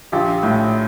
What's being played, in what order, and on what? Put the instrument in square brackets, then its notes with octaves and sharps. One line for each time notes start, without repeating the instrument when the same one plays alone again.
[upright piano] A#1 F4 G4
A2